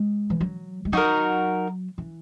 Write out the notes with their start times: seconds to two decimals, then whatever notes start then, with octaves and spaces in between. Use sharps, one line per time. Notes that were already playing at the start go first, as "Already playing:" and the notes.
Already playing: G#3
0.30 E3
0.41 F#3
0.85 G#3
0.92 F#3 D#4 F#4 A#4
1.98 E3